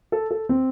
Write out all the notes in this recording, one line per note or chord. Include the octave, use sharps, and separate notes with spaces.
A4
A4
C4